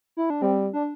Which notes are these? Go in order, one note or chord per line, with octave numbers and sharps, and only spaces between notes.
E4
D4
G3 C4
D4